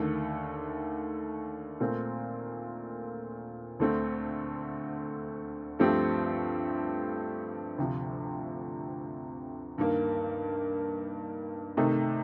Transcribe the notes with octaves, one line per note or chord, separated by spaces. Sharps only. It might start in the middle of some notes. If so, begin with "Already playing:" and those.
Already playing: D#2 D3 A3
A#2 A3 C4
D2 D3 A3 C4
G2 F3 A3 C4 G4
D2 C3 F3
G2 D#3 A#3
C3 D#3 A3 D#4